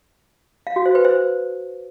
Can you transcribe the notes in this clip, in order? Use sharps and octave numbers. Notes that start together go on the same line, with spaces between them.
F5
F#4
C5
B4
C5